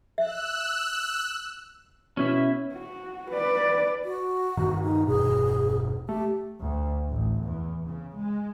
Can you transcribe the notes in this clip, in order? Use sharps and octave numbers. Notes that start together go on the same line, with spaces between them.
E5 E6 F#6
B2 C#4 E4 E5
F#4
B4 D5
F#4
G2 A#2 D#3
D#4
E1 G2 B2 G#4
A3 G4
D2
A1
E2
C#3
G#3